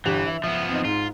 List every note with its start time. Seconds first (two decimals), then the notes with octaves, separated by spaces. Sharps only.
0.06 G1 E3 G4 F7
0.27 E5
0.44 F3 B3 E5
0.69 C4 D#4
0.85 G#2 F4